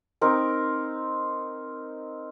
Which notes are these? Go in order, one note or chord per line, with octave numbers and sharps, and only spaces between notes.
C4 D#4 A#4